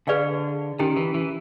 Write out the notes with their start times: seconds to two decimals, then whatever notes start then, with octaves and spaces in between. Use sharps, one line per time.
0.07 D3 G#4 B4 D5 F5
0.79 D#3 C#4 E4 G4
0.96 E3
1.14 E3